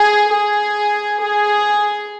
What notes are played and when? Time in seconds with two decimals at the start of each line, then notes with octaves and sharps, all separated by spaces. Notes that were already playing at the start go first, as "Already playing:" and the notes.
Already playing: G#4
0.31 G#4
1.22 G#4